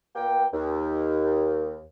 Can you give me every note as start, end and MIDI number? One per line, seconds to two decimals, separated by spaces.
0.16 0.45 46
0.16 0.45 58
0.16 0.45 59
0.16 0.45 79
0.53 1.80 39